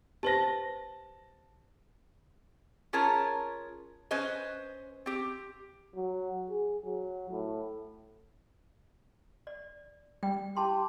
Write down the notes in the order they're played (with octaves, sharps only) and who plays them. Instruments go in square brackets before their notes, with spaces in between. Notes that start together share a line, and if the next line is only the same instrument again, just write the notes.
[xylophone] G4 B4 C5 [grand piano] A5 A#6
[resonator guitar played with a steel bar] C#4 F4 G#4 A#4 C#5 A5
C#4 B4 C5 D#5
C4 G4
[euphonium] F#3
G#4
F#3
A2
[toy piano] D5
[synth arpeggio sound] G3 [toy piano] G5
[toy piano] E4 A5 C6 [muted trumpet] G4